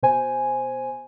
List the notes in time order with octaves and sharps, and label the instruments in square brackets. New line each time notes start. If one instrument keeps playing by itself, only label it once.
[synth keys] B2 C5 G#5